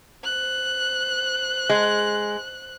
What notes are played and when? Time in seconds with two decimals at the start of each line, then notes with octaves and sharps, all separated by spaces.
0.24 C5 F#6
1.69 G#3